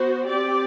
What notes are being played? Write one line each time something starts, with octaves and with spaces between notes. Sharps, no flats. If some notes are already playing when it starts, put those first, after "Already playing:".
Already playing: B3 F#4 C5
C4 G4 D5